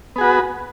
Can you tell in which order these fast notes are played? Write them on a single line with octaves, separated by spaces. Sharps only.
B3 G#4 F#4 B4